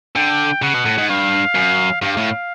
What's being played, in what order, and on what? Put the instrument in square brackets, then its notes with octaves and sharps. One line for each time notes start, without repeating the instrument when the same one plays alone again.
[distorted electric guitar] D3 [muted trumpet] G5
[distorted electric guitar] C#3 [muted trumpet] F#5
[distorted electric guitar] B2
A2
G#2
[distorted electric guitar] G2 [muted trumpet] F5
[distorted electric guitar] F#2
[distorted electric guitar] G2 [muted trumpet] F5
[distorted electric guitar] A2